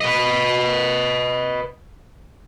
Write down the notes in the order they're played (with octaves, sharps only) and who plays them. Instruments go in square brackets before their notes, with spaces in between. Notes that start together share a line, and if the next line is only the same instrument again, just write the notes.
[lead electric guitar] B4 D#5